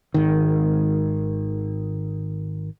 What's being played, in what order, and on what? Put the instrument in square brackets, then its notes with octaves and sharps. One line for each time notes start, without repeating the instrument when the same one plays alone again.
[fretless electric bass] G#1 D#3